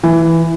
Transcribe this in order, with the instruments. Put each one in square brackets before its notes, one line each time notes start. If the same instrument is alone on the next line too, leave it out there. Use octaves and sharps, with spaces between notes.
[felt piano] E3